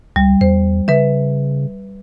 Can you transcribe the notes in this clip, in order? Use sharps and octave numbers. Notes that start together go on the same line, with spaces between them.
C#2 G3
E2 C5
C#3 B4 E5